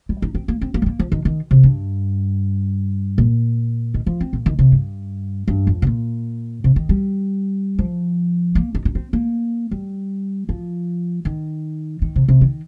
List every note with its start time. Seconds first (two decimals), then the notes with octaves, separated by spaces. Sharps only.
0.09 G3
0.22 D#4
0.35 C4
0.48 A#3
0.61 C4
0.74 A#3
0.82 G3
0.86 A#3
0.99 F3
1.12 D#3
1.25 D#3
1.51 C3
1.63 G2
3.18 A#2
3.94 D#3
4.06 F3
4.20 C4
4.33 A#2
4.46 D#3
4.59 C3
4.72 G2
5.48 G2
5.67 F2
5.82 C3
5.87 A#2
6.64 C3
6.76 D#3
6.89 G3
7.79 F3
8.55 A#3
8.75 D#4
8.85 D#4
8.95 C4
9.13 A#3
9.71 G3
10.49 F3
11.25 D#3
12.02 D#3
12.16 C3
12.28 C3
12.41 D#3